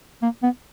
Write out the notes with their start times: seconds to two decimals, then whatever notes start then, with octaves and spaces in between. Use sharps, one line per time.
0.22 A#3
0.43 B3